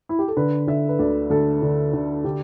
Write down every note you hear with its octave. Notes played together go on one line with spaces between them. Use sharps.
E4
G4
A4
D3 B4
D3 E5
B4
D2 D5
D2 A4
D3
D3
D3 G4